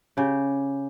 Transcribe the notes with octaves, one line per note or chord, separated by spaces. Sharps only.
C#3 G4